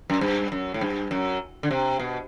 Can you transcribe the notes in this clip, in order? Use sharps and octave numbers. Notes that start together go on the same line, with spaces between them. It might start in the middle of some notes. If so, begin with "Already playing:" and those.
F#2
G2
F#2
A2
G2
F#2
D3
C3
B2